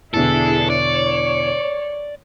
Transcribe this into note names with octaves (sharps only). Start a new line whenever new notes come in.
E2 B2 D3 D4 E4 G#4 A4
C#5 D5